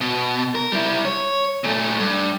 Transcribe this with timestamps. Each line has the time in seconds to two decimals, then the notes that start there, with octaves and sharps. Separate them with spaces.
0.01 B2
0.55 A#4
0.72 G3 E4
1.05 C#5
1.64 A#2 A3
2.00 G2